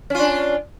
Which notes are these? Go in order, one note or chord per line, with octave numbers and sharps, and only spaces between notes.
C#4 D4 F4